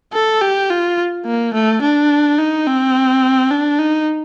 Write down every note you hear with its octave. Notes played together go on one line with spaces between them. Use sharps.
A4
G4
F4
A#3
A3
D4
D#4
C4
D4
D#4